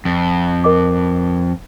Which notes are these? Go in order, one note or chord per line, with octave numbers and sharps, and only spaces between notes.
F2
A#4 D#5 D6